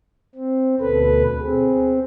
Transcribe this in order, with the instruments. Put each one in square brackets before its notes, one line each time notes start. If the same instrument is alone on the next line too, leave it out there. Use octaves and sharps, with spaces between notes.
[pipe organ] C4
[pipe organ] D2 B2 B4 [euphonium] A4
[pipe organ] C4 [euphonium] G#4